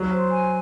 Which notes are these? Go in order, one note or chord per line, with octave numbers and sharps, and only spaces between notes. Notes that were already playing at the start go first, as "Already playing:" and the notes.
Already playing: F#3
C5
G#5